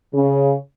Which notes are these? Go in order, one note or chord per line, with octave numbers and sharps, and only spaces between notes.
C#3